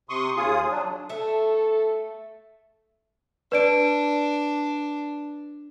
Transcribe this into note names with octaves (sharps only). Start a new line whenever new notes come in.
C3 C6 C#6 D#6
D#2 F4 G#4 D#6
F#3 D4
A3 A4 E5
D4 B4 D5 D7